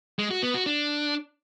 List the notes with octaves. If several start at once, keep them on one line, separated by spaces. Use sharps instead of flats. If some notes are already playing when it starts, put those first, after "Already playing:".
G#3
F#4
B3
F#4
D4